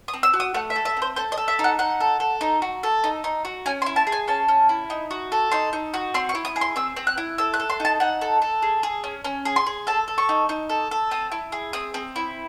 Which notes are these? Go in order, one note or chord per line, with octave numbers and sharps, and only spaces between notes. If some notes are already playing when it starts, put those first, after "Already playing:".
D#6
C4
E6
F#4
D#6
A3 F#5
E5
A4
E5
C4
C5
A4 C5
D#5
A4
E5
D#4
F#5
D#4 F#5
A4
A4
D#4
F#4
A4
D#4
D#4
F#4
C#4 G#5
C6
E4
A5
G#4
G#5
C#4 A5
C#4
E4
D#4
F#4
A4
D#4 C6
D#4
F#4
C4 C6
C#6
E4
D#6
G#4
C6
C4 E6
C4
F#6
E4
A4 E6
F#6
A4
C6
D#4 A5
D#4 F#5
A4
A4
G#4
G#4
C#4
C#4
G#4
C6
G#4
A4 A5
A4
C#6
D#4
D#4
A4
A4
C4 D#6
E4
G#4
C4 D#6
C4
E4